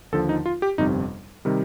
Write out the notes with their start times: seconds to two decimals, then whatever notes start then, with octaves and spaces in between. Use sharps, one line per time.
0.12 D#2 D3 F3 A4
0.29 D#4
0.46 F4
0.62 G4
0.78 G1 F2 C3 G3 D#4
1.45 C3 D#3 G3